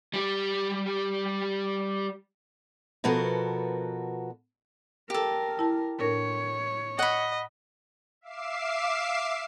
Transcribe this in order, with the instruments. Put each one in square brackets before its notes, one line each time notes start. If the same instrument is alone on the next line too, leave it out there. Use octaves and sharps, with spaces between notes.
[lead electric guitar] G3 G4
[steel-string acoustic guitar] B2 F3 B3 F#4 A4 A#4
[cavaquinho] G4 A4 [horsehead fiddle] A#4
[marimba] E4 A5
[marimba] A2 D4 A#4 [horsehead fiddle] C#5
[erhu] D#5 [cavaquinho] F#5 B5
[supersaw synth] E5 F5 D6 C7 E7